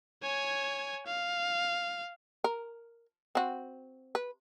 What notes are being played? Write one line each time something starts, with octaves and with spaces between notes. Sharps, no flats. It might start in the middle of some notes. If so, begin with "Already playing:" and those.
C#5 G#5
F5
A#4
C4 F#4
B4